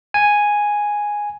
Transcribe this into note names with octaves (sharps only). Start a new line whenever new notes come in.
G#5